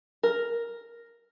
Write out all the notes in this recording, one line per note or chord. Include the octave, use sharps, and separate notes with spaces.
A#4